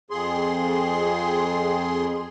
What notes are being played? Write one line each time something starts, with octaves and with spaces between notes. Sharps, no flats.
F2 G#4 C6